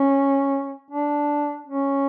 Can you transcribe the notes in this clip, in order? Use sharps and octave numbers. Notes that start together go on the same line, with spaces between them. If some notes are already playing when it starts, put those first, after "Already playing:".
Already playing: C#4
D4
C#4